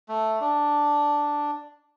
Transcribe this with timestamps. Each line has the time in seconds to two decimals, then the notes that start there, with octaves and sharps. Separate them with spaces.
0.09 A3
0.41 D4